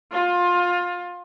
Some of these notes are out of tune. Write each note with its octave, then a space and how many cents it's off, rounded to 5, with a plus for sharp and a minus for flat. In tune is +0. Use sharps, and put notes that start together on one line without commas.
F4 +20